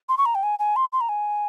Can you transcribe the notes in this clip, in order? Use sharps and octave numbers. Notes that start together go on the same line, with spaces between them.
C6
C#6
A#5
G5
G#5
G#5
C6
C6
A#5
G#5